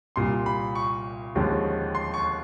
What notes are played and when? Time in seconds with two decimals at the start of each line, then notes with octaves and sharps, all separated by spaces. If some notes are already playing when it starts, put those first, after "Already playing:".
0.16 C2 A#2 G3 C6
0.46 B5
0.75 C#6
1.35 D#2 D3 F3 G#3 C#4
1.95 C6
2.14 C#6